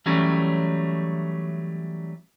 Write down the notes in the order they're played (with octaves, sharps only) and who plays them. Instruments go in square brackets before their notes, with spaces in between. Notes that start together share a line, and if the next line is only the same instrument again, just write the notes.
[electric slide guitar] E3 F#3 G3 A3 C#4